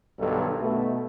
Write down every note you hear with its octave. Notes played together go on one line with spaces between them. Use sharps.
B1 G2 D#3 A4
B2 A3